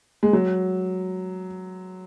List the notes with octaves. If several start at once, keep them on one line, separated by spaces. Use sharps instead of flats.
G#3
F#3